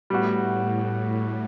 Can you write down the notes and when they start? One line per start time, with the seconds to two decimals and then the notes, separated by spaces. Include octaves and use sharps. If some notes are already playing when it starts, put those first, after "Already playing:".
0.10 A2 G3 B3 F#4